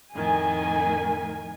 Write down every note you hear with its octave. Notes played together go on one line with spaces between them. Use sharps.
F2 A2 D#3 G#5